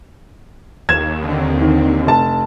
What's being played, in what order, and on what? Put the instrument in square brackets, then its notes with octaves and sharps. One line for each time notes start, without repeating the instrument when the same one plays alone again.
[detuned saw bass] D#2 [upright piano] G#6 E7
[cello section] D3 C4
[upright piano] D#3
F1 A5